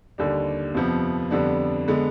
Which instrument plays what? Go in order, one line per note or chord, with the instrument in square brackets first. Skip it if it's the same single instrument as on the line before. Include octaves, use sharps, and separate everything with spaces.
[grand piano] D#2 D3 G3 D4
F2 C3 F3 B3
F2 D3 G3 B3 D4
D3 G#3 B3